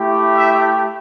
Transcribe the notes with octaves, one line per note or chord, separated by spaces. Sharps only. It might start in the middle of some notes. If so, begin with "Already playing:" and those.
Already playing: A3 E4 G4
E5